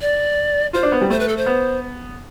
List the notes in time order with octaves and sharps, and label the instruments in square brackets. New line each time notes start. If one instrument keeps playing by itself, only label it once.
[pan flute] D5
[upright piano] F4 [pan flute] C5
[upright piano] D4
B3
G3
[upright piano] A3 [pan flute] C5
[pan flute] B4
A4
C5
[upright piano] B3